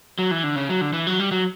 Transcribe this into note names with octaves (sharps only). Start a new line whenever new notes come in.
F#3
E3
D3
C#3
F#3
D3
E3
F#3
G3
F#3